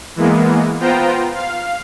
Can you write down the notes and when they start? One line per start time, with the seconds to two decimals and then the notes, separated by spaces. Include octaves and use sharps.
0.16 E3 G#3 A#3 B3
0.80 B3 F4 C5 G5 A#5
1.35 F5